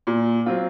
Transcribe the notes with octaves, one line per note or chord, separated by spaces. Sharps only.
A#2
F#3 C4 F4